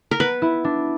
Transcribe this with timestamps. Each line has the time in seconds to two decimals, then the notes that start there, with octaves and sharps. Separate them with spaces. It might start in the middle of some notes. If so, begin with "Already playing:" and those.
0.11 A#4
0.20 B3 B4
0.42 E4
0.64 D4